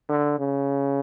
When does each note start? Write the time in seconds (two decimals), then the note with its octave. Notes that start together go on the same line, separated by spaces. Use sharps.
0.09 D3
0.39 C#3